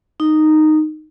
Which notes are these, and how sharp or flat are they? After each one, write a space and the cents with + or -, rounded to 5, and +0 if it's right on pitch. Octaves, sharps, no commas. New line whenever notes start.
D#4 -10